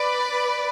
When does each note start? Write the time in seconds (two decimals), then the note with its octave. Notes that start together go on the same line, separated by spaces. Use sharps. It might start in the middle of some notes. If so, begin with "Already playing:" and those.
Already playing: B4 D5